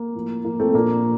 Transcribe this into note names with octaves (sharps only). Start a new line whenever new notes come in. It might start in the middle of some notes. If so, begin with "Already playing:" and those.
Already playing: A#3
A2 F3
A2 F3 A#3
A3 C4
A#2 F3 A#3 D4